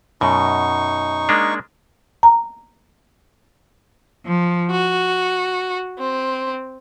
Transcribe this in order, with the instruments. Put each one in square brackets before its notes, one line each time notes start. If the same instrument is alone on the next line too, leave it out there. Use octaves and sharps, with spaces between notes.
[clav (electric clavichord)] F#2 B2 [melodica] D#4 C#6
[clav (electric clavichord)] G#3 A#3 D4
[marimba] A#5
[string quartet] F3
F#4
C4